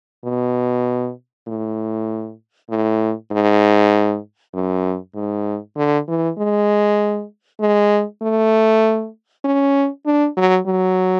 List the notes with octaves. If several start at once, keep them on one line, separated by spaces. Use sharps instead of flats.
B2
A2
A2
G#2
F#2
G#2
D3
E3
G#3
G#3
A3
C#4
D4
F#3
F#3